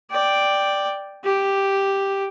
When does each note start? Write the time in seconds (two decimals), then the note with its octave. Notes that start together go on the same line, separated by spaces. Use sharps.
0.11 D5 G5
1.24 G4